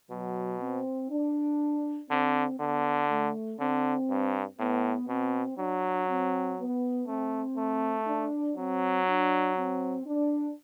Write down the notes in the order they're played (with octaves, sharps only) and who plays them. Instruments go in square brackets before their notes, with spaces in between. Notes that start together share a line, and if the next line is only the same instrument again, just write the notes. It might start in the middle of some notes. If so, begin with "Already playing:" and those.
[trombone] B2 [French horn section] F#3
[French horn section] C4
D4
[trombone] D3 [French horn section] C4
[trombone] D3 [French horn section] B3
[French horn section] A3
[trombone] D3 [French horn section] C4
[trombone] G2
[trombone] A2 [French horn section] B3
[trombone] B2 [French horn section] C4
[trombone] F#3 [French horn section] D4
[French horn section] C4
B3
[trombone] A3 [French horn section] C4
[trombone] A3
[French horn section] D4
[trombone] F#3 [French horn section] C4
[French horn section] D4
C4
D4